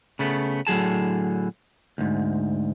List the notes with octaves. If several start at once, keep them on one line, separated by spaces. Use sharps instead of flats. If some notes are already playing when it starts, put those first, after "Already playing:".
C#3 A3 B3
A2 D3 F#3 G#4 A5
D2 G#2